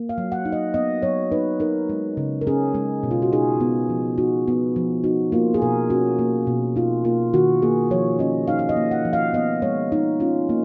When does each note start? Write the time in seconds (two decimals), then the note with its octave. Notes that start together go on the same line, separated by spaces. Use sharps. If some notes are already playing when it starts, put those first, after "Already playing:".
Already playing: A#3
0.09 F5
0.18 F#3
0.32 F#5
0.45 D#4
0.52 D#5
0.74 B3 D#5
1.02 F#3 C#5
1.32 D#4 B4
1.60 D#4 A#4
1.89 G#3
2.17 C#3
2.41 A#4
2.47 C#4 G#4
2.74 G#3
3.03 B2
3.11 F4
3.22 F#4
3.32 D#4 G#4
3.60 B3
3.90 F3
4.18 D#4 F#4
4.48 B3
4.76 F3
5.04 D#4 F#4
5.32 A#3 F4
5.54 G#4
5.62 B2 A#4
5.90 C#4 F#4
6.19 A#3
6.47 B2
6.76 D#4 F4
7.05 A#3 F4
7.33 D#3 F#4
7.62 A#3 G#4
7.91 F3 C#5
8.19 C#4 D#5
8.48 D#4 F5
8.59 F5
8.69 D#5
8.76 A#3
8.91 F#5
9.05 F3
9.13 F5
9.33 B3 D#5
9.62 G#3 C#5
9.92 D#4
10.20 C#4 F4
10.49 A#3